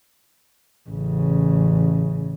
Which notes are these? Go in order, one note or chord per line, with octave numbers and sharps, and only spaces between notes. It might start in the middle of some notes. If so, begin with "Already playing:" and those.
A1 C#3